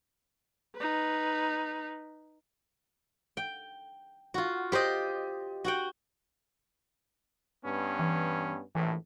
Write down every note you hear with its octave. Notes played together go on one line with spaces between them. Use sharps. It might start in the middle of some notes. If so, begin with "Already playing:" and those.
D#4 B4
G5
F4 F#4
G4 C5 D5 D#5
F#4 F#5 G5
G2 B3 C#4
E3
A#1 A2 E3